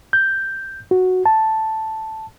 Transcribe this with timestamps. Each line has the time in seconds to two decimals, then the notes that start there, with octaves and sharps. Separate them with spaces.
0.13 G6
0.91 F#4
1.26 A5